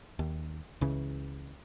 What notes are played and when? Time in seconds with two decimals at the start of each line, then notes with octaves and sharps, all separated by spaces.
0.19 D#2
0.81 C#2 C#3 E3